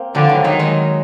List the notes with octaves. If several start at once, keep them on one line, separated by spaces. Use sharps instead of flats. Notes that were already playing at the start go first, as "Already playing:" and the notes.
Already playing: A#3 C4
D3 F3 G3
E3 F#3
D#3 F#3 G#3
F#3 G#3